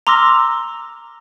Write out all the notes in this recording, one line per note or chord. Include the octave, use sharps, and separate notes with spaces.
A#5 C6 D6 E6 F6 A#6